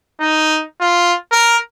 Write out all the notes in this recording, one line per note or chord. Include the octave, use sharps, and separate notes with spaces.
D#4
F4
A#4